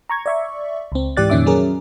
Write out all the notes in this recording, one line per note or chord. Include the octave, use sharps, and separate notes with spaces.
A#5 C#6 G#6
D5 E5 C#6
C#2 C4
G#2 E3 G4 D5 F#6 A6
F2 A#2 D#3 C#4 E5 D6
F#3 C#4 G#4 A#4